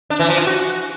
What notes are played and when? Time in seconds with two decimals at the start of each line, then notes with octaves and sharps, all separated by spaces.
0.10 D4
0.19 E3
0.29 F3
0.38 F4
0.47 F#4